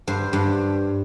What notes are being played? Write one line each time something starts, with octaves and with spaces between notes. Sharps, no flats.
G2 C5
G2